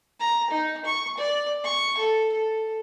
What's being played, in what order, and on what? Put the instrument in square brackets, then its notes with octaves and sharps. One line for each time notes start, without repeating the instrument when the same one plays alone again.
[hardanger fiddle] A#5
D#4
C#6
D5
C#6
A4
A4